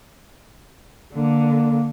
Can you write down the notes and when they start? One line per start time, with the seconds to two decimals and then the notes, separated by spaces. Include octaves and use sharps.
1.14 D3 A#3